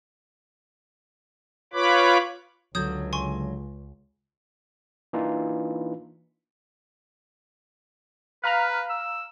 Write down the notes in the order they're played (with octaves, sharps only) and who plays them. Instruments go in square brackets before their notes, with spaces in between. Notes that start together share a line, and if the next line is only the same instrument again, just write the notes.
[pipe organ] F4 B4 C#5 B5 D6
[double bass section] C#2 [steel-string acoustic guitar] D3 F#3 [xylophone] D#6 G6 G#6
[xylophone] G#5 C6 C#6
[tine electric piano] E3 A#3 D4 D#4 F4
[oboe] B4 [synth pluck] F5 A#5 F6
[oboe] E6